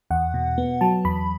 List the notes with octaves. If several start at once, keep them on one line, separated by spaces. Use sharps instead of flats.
E2 F#5
B2
B3
F#3 A5
E2 B5